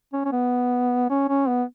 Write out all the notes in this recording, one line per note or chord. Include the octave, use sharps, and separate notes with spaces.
C#4
C#4
B3
C#4
C#4
B3